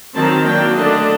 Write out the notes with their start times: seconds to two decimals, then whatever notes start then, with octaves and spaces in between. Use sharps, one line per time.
0.15 D#3 F#3 C4 D#4 A5
0.45 F#3 A#3 D4 G5
0.75 D3 A3 D4 D#5